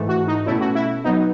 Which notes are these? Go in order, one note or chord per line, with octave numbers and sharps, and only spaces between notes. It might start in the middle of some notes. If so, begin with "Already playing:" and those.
Already playing: G#2 E3 A3
F#4
D#4
B2 A3 C#4 E4
F#4
E4
F#3 B3 D#4